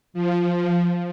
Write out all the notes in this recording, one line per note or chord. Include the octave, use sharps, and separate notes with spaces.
F3